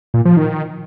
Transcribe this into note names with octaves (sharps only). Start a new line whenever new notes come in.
A#2
F3
D#3